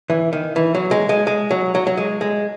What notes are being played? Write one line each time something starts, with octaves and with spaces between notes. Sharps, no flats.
E3
D#3
E3
F#3
G#3
G#3
G#3
F#3
F#3
F#3
G#3
G#3